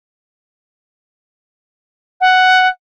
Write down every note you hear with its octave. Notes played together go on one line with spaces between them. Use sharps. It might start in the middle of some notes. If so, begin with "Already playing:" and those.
F#5